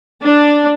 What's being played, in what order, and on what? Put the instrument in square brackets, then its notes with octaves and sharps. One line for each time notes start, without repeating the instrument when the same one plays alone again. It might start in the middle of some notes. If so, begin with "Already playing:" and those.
[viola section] D4